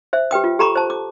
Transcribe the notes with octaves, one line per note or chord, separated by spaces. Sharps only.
C5 E5
G4 B4 G5 D#6
F4
G4 A4 A#5 B5 C#6 D6
C5 A5
D6